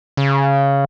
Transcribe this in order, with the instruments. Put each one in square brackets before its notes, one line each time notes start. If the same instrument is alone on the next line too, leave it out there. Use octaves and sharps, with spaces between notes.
[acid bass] C#3